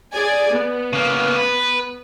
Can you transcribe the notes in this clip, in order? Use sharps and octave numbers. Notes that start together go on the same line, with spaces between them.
G#4 D5 G#5
B3
C#3 A#3
B4